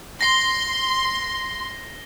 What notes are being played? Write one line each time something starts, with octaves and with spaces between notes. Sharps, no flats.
C6 A#6 C7 G7